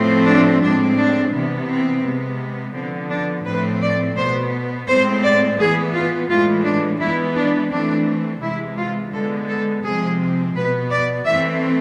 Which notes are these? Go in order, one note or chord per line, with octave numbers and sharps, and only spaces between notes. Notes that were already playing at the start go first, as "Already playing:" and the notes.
Already playing: A2 F3 A3 C4
D4
A2 G#3 C4 D4
D4
C3 E3 B3
C4
C3 G#3 B3
D3 F3 B3 C4
D4
A2 F3 A3 C4 B4
D5
B2 B3 C5
A2 G#3 C4 C5
D5
E3 B3 G#4
F4
A2 E3 G#3 F4
D4
E3 G#3 B3 E4
D4
E3 A3 C4 D4
C3 E3 G#3 E4
F4
D3 G#3 B3 A4
A4
C3 F3 G#3 C4 G#4
B2 B3 B4
D5
E3 A3 C4 E5